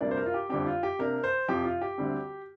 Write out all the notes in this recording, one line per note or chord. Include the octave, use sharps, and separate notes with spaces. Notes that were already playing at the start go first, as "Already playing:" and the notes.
D2 C3 G3 A#3 D4 D5
C5
A#4
F4
G4
F2 D3 G3 C4 G4
F4
G4
C3 A#3 D4 A#4
C5
F2 C3 F3 C4 G4
F4
G4
D2 D3 G3 C4